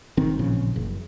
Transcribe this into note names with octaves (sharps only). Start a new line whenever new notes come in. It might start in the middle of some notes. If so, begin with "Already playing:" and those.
G1 D#3 C4
A1 A#2 C#3 F3
F#1